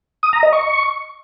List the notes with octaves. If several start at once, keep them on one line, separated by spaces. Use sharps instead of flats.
D#6
A#5
D#5
C#6